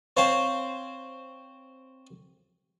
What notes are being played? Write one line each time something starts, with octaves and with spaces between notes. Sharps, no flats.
C4 C5 C#5 F5 A5